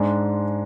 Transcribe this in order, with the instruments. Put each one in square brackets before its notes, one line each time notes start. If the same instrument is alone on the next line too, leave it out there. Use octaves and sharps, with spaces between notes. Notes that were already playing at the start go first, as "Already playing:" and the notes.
Already playing: [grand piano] G#2 G#3 D4